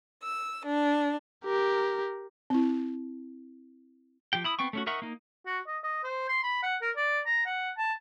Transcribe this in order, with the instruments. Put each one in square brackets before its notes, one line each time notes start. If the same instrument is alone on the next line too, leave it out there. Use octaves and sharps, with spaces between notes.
[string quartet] E6
D4
[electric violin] G4 A#4
[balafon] C4 E4
[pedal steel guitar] F3 G4 G5
E4 B5 D#6
B3 C4 G5 C#6
A3 C#4 F#4
D#4 A#4 E5 F#5 C#6
A#3 D#4
[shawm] F#4
D#5
D#5
C5
C6
B5
F#5
A#4
D5
A#5
F#5
A5